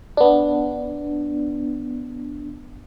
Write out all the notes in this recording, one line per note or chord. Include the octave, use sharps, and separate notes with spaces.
B3 D4